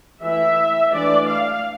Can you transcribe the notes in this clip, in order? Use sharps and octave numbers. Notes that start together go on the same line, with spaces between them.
E3 A3 E4 E5
E3 A3 D4 D5
F5